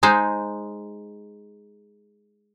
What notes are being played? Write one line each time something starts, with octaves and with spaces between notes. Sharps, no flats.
G#3 D#4 C5